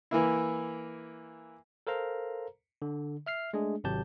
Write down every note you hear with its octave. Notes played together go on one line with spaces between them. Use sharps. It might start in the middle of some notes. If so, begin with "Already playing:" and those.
E3 A#3 E4
A4 A#4 C5 F5 A#5
D3
E5 F6 C7
G#3 A3 D4 G#4
G#1 C3 F#3 G4 A5 G6